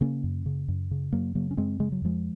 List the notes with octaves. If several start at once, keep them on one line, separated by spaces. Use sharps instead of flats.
C#3 A#3 C#4
F#2
C#3
F#2
C#3
F#2 F#3 A#3
C#3 F#3 A#3
C#4
F#2 G#3 C4
C#3 G#3
F#3
F2 F3 G#3